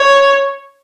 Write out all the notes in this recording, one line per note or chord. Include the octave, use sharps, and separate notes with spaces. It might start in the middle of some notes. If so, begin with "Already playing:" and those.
Already playing: C#5